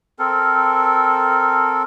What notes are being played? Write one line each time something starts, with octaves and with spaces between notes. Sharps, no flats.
C4 A4 A#4